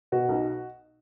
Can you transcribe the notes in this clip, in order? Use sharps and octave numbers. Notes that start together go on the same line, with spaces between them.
B2 F#4
B1